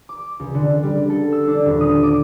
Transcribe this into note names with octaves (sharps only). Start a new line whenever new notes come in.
D6
C#2
D3
G3
A4
E6
D4
D#1
D#6
D6